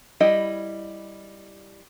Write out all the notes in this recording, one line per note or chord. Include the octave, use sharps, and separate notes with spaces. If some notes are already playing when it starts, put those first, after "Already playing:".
G3 E4 D#5